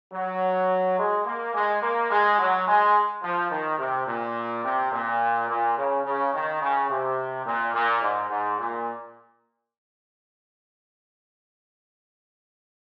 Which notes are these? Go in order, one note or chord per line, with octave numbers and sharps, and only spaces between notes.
F#3
G#3
A#3
G#3
A#3
G#3
F#3
G#3
F3
D#3
C3
A#2
C3
A#2
A#2
C#3
C#3
D#3
C#3
C3
A#2
A#2
G#2
G#2
A#2